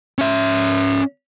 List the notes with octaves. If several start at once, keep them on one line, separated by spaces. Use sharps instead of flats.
C#4 E5